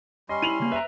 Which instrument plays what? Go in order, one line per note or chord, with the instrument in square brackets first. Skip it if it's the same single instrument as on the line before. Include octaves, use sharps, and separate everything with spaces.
[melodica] G3 C#4 C6 [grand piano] D#5
[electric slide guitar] E4 [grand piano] D#7 F7 F#7
[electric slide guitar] C#3 A#3
[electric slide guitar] B4 A#5 [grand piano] E5